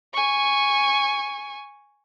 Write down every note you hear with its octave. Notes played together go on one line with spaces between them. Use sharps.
G#5 C#6